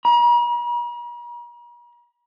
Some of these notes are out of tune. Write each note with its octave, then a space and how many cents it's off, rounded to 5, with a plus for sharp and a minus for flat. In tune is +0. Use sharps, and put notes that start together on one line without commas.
A#5 +45